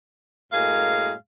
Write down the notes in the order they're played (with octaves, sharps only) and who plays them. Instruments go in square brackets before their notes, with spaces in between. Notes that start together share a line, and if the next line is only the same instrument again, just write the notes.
[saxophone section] F#2 A2 G#3 A#3 G#4 F5